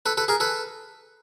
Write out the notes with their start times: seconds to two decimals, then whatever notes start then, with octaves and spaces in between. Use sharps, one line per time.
0.06 A4 B4
0.17 A4 B4
0.28 G#4 A#4
0.40 A4 B4